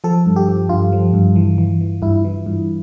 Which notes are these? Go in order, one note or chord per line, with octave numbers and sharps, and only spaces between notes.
F3 A4
G2
G4
F3
G2 F4
F3
G2
E3
E3
E3
G2 E4
E3
G2